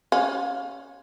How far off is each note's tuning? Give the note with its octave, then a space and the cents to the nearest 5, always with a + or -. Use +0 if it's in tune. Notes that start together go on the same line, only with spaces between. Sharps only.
C#4 +0 F5 +20